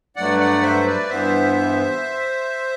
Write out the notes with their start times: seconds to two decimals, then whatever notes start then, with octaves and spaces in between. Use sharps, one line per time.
0.16 G2 F#3 A3 D5 F#5
0.40 D5 F#5
0.62 C5 E5
0.86 B4 D5
1.09 G2 E3 B3 C5 E5